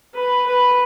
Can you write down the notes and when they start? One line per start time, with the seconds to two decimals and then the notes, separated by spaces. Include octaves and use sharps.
0.15 B4
0.47 B4